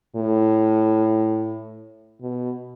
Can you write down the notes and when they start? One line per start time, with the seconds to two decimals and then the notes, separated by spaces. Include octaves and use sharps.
0.16 A2
2.21 B2